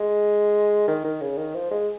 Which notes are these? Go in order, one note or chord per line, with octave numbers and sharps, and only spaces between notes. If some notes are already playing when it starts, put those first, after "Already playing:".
Already playing: G#3
D#3
D#3
C#3
D#3
F3
G#3